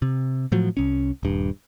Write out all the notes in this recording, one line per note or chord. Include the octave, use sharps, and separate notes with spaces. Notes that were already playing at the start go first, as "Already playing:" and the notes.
C3
A2 F3 F#3
C2 C#4
D#1 G2